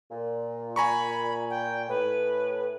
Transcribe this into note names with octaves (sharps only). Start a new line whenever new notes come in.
A#2
G#5 A#5 B5 C#6
G5
A2 B4